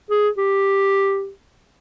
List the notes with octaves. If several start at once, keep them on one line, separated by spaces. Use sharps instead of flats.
G#4
G4